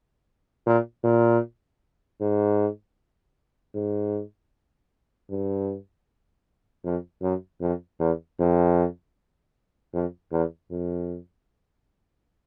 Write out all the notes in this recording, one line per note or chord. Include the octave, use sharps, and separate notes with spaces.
A#2
A#2
G#2
G#2
G2
F2
F#2
F2
E2
F2
F2
E2
F2